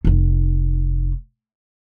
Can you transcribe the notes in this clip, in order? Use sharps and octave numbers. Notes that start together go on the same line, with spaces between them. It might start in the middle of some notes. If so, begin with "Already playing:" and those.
F1 D#4